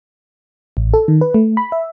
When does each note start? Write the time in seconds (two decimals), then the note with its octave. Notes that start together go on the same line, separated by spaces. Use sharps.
0.77 A1
0.94 A4
1.08 D#3
1.21 B4
1.34 A3
1.57 B5
1.72 E5